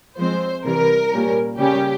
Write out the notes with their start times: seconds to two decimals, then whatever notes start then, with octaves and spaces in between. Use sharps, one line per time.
0.18 F3 G#3 C4 C5
0.64 C3 E3 G3 A#4
1.12 A#2 G3 C#4
1.58 C#3 G3 A#3 C#4 G4